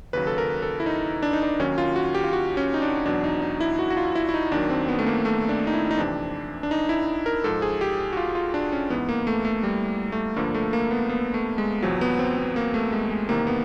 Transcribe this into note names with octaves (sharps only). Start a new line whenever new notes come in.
D#2 C#3 F#3 B4
A4
A#4
A4
E4
D#4
D4
D#4
D4
D#2 D#3 F#3 C#4
F4
F#4
G4
F4
F#4
C#4
D#4
D4
E2 B2 F#3 D4
D#4
D#4
E4
F#4
F#4
F4
E4
E4
D#4
D#2 D#3 F#3 D4
C4
B3
A3
A#3
A3
D4
D#4
E4
D#4
F2 C3 E3 D4
D4
D#4
E4
A#4
G#2 F3 A4
G#4
G4
F#4
F4
F4
D4
C#4
G#2 E3 B3
A#3
A3
A3
G3
A3
G2 D3 F3 A#3
A3
A#3
B3
B3
A3
G#3
E2 C3 F3 F#3
B3
C4
B3
A#3
A3
G#3
G#3
E2 C3 D#3 A#3
B3